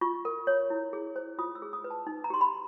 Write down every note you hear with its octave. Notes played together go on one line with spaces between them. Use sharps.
F4 C#6
A#4
C#5
E4
G#4
C5
F4 D#6
E6
G#4
D#6
B4
A5
D#4
A#5
G4 C6
B5